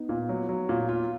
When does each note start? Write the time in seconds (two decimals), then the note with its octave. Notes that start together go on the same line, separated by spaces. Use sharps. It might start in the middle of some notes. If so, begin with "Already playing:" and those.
Already playing: B3 D#4
0.09 A#2
0.29 F#3
0.49 F#3
0.69 A#2
0.89 F4